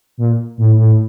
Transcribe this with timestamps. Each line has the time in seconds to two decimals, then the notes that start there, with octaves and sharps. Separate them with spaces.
0.18 A#2
0.58 A2
0.77 A2